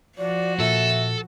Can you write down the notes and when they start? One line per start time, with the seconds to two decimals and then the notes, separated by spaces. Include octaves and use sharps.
0.18 F3 F#4 D5
0.60 A#2 A4 E5